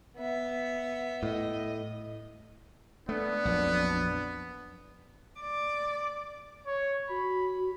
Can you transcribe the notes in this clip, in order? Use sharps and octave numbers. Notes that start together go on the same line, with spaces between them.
B3 E5
A2 D#5
A3 B3 D4
A#1 F2 F#3
D5
C#5
F#4 B5